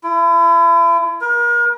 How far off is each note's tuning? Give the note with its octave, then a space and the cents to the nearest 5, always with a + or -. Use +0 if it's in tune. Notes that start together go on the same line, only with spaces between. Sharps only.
E4 +35
A#4 +35